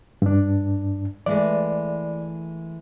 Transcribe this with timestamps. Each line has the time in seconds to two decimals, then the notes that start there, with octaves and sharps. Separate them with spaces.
0.22 G2 D4
1.26 E3 G#3 A3 D5